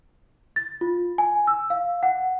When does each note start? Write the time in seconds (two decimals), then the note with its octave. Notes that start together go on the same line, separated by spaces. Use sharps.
0.56 A6
0.81 F4
1.18 G#5
1.47 E6
1.70 F5
2.03 F#5